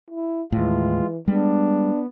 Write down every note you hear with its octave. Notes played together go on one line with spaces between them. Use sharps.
E4
D#2 A2 E3 G#3 F4
G3 G#3 B3 D4